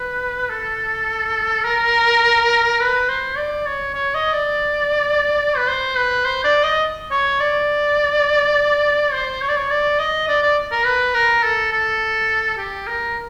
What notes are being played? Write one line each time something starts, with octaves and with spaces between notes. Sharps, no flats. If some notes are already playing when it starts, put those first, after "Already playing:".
Already playing: B4
A4
A#4
B4
C5
D5
C#5
C#5
D#5
D5
B4
C5
B4
C5
D5
D#5
C#5
D5
C5
C#5
D5
C#5
D5
D#5
D5
D5
A#4
B4
A#4
A4
A4
G4
A#4